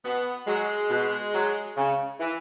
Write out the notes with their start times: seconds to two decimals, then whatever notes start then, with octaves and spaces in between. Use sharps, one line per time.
0.04 B2 B3
0.47 F#3 G#3
0.90 B2
1.33 F#3
1.77 C#3
2.19 E3